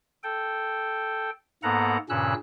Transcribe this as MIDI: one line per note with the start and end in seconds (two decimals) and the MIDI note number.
0.23 1.30 69
0.23 1.30 79
1.63 1.97 44
1.63 1.97 58
1.63 1.97 59
1.63 1.97 69
1.63 1.97 78
1.63 1.97 82
2.09 2.34 43
2.09 2.34 46
2.09 2.34 49
2.09 2.34 61
2.09 2.34 88
2.09 2.34 90